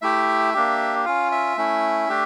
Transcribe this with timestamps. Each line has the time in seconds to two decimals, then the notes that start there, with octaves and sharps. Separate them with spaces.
0.02 A3 E4 G4 E5
0.54 A#3 D4 G4
1.05 C#4 F4 F5
1.32 E5
1.57 A3 C#4 E4
2.09 A3 D4 G4